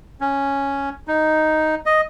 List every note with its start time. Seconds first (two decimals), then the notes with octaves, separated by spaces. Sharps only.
0.21 C#4
1.08 D#4
1.86 D#5